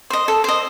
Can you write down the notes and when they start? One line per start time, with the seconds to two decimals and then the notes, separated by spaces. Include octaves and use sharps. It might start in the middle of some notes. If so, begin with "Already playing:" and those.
0.10 C5 D#5
0.28 A4
0.44 C5 D#5